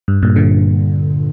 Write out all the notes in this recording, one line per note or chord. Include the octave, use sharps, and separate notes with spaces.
G2
G2 A#2
A#2 D3